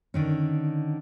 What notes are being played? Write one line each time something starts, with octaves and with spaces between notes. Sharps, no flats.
D3 D#3 C#4